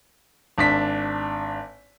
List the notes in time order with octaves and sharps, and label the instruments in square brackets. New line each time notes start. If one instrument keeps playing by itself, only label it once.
[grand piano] G#1 D4 B6